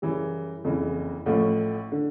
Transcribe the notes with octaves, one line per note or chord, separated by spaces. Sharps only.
F#2 C#3 E3 G3
F#1 F2 C#3 E3
A1 A2 F3 A3
D3